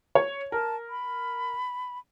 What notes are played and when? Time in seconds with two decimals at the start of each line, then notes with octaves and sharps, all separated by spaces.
0.15 C#5
0.52 A#4 A5
0.90 B5